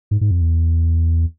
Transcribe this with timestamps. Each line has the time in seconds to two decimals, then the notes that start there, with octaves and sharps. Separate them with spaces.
0.11 G#2
0.21 G#2
0.31 F2
0.41 E2